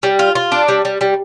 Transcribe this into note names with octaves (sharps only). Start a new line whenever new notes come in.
G3
F4
F4
D4
G3
G3
G3